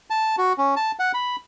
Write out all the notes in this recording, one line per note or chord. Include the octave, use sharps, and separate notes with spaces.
A5
F#4
C#4
A5
F#5
B5